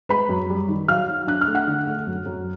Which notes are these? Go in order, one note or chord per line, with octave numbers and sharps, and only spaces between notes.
G#3 B4 B5
F#2
G3
D#3
F#3 F5 F6
F#3
D4 F#6
F6
A3
F#5 F#6
D3
A3
F#2
F#2